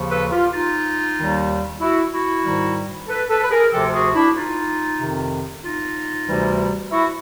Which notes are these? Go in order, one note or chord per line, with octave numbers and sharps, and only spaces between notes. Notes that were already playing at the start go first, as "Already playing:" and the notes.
Already playing: D#2 C#3 F3
A4 B4
F4 G4
D#4 F4
D#2 D#3 G3
E4 F#4
E4 F#4
G#2 D#3 G3
A4 B4
A4 B4
B4
G#4 A#4
D2 C3 F3 G4 A4
F#4 G#4
D4 E4
D#4 F4
F2 C3 D#3
D#4 F4
D2 C3 E3 G3
E4 F#4